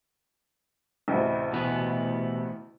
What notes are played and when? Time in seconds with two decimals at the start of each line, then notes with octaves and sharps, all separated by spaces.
1.08 A1 D2 C3
1.53 B2 E3 B3